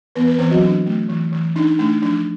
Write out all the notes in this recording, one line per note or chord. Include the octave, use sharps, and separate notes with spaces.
E3 B3 B4
B4
E3 C4 C5
F#3 F#4
D4
A3
E3
E3
D4 D#4
A3 D4
F3 D4